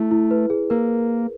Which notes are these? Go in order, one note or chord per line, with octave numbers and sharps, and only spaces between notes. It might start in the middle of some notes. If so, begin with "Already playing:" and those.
Already playing: A3 E4
E4
B4
G#4
A#3 A#4